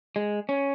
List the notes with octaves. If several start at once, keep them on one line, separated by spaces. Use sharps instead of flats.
G#3
C#4